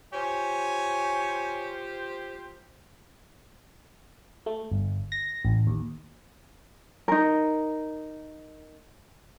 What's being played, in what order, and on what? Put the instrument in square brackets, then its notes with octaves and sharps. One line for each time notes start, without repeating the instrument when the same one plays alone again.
[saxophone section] F4 G4 C5 [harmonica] C#5 G#5
[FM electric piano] A3
G1
A#6
A1
D#2
[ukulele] D#4 A#4